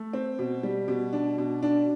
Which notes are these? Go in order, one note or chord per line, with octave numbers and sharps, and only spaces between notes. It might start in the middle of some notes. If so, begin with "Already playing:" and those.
Already playing: A3
C4
B2
G3
B2
D4
B2
D4